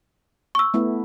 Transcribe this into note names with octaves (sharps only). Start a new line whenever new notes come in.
C#6 E6
A3 B3 E4